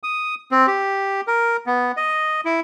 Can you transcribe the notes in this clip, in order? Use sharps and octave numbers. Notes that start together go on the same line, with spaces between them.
D#6
C4
G4
A#4
B3
D#5
E4